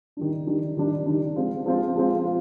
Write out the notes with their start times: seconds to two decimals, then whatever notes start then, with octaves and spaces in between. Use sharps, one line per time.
0.17 D#3 G3 D4
0.47 D#3 G3 D4
0.77 D#3 G3 D4
1.06 D#3 G3 D4
1.36 F3 G#3 C4 F4
1.66 F3 G#3 C4 F4
1.96 F3 G#3 C4 F4
2.25 F4